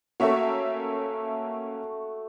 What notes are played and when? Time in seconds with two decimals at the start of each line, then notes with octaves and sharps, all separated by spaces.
0.20 A3 A#3 C#4 F#4 E5